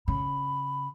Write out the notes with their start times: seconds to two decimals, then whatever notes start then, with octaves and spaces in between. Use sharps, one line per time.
0.08 C#3 B5